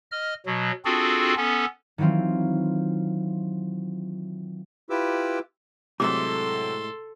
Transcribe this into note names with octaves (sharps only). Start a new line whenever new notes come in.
D#5 F6
B2 F#3
C4 D4 F4 F#4 G#4 A4
B3 C#4 A4
D#3 E3 F#3 C4 F4
E4 F4 G4 B4 D6 E6
A2 C3 F#3 G#3 A3 A4 C6 D6